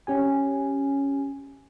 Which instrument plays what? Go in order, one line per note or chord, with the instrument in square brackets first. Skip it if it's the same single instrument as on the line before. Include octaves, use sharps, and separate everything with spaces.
[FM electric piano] C#4 G4 G#5